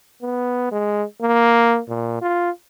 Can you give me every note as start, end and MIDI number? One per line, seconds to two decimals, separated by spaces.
0.22 0.71 59
0.72 1.04 56
1.22 1.80 58
1.89 2.17 46
2.22 2.51 65